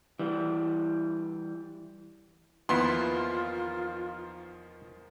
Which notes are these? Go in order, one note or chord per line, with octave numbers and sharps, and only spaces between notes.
E3 G3
E2 D#3 F3 A#3 B3 E4 F4 C6